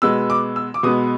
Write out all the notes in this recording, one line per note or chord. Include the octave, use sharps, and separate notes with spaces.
B2 G#3 B3 E6
D6
E6
D6
B2 G#3 B3 D#6